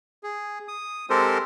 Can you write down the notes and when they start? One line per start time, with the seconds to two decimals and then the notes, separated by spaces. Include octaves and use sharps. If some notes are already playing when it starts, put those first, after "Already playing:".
0.23 G#4
0.68 D#6
1.10 G#3 C4 G4 A4 A#4 C5